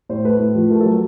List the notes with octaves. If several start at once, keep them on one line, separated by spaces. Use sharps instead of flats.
A2 C5
A3 B4
A2
F3
A3 A#4
F#3 A4